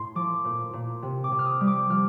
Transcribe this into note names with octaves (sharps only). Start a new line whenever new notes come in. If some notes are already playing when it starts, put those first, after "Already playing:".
Already playing: A2 C6
F3 D6
A#2
A#2
C3
D6
C3
F6
D#6
G3
D6
F3 F6